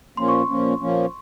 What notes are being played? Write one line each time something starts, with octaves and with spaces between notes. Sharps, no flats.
A#2 F3 A#3 C#4 C6
C#6
A#2 F3 A#3 C#4
A#2 F3 A#3 C#4